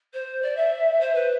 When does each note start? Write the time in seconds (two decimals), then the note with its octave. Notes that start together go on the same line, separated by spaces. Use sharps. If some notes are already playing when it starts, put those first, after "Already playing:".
0.13 C5
0.42 D5
0.56 E5
1.00 C5
1.14 B4